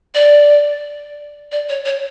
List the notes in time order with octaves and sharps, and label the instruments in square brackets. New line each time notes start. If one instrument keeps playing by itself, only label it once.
[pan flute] D5
D5
C#5
C#5